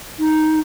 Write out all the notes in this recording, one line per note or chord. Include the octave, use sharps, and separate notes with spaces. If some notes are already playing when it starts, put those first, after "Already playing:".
D#4